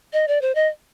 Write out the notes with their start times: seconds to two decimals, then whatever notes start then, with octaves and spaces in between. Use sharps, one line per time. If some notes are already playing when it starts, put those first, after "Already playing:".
0.13 D#5
0.28 D5
0.42 C5
0.55 D#5